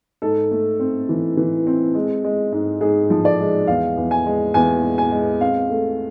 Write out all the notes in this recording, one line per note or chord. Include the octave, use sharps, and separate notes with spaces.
G#2 A4
A3
C4
E3
E3
C4
G#3
G#3
G#2
G#2 G#4
F3
D5
G#3
E2 F5
E2
G#5
G#3
E2 G#5
G#3
G#5
G#3
C4 F5
A3